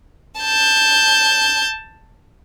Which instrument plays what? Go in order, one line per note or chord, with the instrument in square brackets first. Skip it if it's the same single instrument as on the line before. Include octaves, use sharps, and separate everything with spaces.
[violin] A5 G6